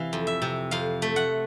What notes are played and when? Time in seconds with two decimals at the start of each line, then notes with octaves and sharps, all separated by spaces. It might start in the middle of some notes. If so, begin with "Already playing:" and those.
Already playing: C3 E3 F5
0.13 F2
0.27 E5
0.42 C3
0.71 F2 F5
1.02 A3
1.16 F#5